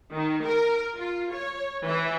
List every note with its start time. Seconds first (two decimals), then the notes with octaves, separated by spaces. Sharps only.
0.14 D#3
0.45 A#4
0.97 F4
1.32 C#5
1.85 E3